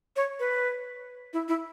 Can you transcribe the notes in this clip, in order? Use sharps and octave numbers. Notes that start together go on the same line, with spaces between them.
C#5
B4
E4
E4